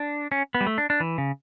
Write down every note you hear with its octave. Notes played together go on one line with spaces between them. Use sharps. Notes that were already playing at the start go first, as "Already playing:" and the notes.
Already playing: D4
C#4
B3
G3
A3
D4
D4
E3
C#3